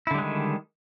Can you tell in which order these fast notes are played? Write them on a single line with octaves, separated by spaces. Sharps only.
E4 D3 G3 G#3 D#3